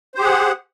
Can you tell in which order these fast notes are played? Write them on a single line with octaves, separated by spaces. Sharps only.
C5 G4 G#4 F#5